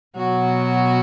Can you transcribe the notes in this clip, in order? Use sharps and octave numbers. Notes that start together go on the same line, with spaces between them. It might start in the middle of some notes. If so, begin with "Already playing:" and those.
B2 F#3 F#4